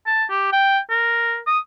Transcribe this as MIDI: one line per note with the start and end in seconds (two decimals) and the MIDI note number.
0.07 0.25 81
0.30 0.49 67
0.52 0.79 79
0.90 1.38 70
1.47 1.59 87